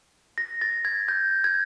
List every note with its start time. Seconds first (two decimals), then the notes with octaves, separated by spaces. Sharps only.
0.38 A#6
0.61 A6
0.85 G#6
1.08 G6
1.44 G#6